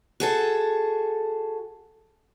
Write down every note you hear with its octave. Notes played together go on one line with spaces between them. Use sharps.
F#4 G#4 A4